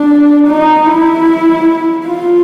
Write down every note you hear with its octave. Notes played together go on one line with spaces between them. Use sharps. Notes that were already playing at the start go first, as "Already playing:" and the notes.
Already playing: D4
D#4
E4
F4